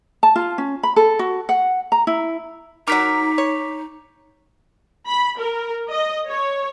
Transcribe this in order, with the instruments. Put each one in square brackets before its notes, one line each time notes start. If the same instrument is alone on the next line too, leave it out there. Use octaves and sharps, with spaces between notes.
[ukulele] A5
F4
C#4
B5
A4
F#4
F#5
A#5
E4
[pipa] F#3 A#4 [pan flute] D#4 [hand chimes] D6 B6
[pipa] C#5
[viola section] B5
A#4
D#5
C#5